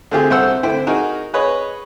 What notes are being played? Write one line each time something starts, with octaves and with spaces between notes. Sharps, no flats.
D3 A3 C4 F4 G4 G#4
C2 A4 C5 F#5 E6
D3 E4 C5 G5
D#4 F#4 G#4 A#4
G#4 B4 C#5 D#5